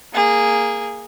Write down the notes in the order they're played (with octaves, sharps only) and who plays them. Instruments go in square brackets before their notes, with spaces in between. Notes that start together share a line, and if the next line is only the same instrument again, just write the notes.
[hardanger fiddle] A#3 G#4